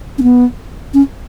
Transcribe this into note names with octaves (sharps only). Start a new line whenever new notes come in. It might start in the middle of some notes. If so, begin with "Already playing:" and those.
C#4
B3
C#4